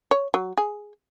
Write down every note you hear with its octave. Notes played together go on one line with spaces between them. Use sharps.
C#5
F#3
G#4